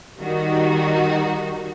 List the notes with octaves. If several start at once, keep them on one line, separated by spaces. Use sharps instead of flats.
D#3 G3 D#4 F#4